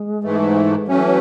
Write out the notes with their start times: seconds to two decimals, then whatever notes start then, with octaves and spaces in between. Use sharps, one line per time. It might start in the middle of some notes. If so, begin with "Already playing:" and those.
Already playing: G#3
0.23 G#2 E3 A3
0.88 E3 F#3 A3 C#4